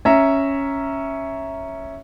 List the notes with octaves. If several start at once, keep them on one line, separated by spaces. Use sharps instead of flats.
C#4 E5 A#5